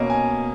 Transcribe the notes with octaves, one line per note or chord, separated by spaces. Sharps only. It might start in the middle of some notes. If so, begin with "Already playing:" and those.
Already playing: B2 A#3 C#4 D#5
G#5